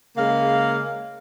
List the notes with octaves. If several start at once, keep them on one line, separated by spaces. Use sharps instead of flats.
C#3 G#3 A#3 F5